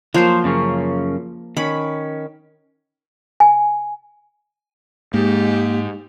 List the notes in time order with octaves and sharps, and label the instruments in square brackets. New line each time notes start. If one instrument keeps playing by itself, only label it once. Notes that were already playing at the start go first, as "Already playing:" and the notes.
[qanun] F3 A#3 [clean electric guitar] F#3 C5
[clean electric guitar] F#2 C#3 C#4
[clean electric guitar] D#3 C#4 [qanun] B5
[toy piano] G#5
[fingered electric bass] G#2 [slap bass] A#3 [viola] G4